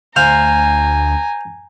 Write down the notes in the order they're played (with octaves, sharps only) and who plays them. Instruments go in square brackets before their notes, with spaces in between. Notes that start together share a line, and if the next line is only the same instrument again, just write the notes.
[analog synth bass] D2 [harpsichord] C5 F5 [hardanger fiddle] G#5 A#5